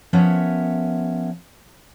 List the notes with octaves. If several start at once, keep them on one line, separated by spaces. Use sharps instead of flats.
F3 B3 C#4 A#4 C#5 E5